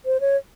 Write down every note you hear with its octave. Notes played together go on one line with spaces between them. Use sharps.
C5
C#5